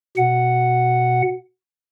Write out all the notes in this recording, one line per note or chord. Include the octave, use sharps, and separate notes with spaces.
B2 F#5